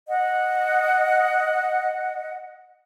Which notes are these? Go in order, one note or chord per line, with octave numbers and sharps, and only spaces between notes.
D#5 F#5